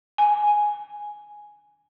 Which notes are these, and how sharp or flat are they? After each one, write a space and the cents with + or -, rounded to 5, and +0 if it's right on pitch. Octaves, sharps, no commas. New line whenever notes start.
G#5 +0